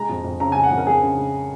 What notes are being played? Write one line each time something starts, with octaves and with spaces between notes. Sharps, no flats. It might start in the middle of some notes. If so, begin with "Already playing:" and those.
Already playing: G#3 A#5
F2
F2
C#3 A#5
G#5
G#3
F#5
F2
A#4
F2 G#4
C#3
G#3